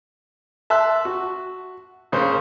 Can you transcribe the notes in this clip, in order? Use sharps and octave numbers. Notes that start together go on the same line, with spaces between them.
E5 A5 C6 E6 F#6
F#4
A#1 C#3 C5 C6